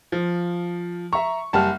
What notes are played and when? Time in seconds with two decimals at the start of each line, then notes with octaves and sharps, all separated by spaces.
0.12 F3
1.13 E5 A#5 C#6
1.53 F#1 G3 F#5 A5 F6